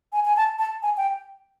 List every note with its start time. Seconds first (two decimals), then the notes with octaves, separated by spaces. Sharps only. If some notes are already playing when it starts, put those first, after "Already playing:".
0.13 G#5
0.25 G#5
0.37 A5
0.59 A5
0.83 G#5
0.97 G5